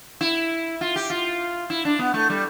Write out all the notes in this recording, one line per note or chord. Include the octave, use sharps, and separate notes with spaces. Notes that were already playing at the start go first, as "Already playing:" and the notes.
E4
F4
G4
F4
E4
D4
B3
A3
G3